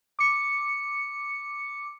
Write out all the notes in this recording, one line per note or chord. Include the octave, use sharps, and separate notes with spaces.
D6 C#7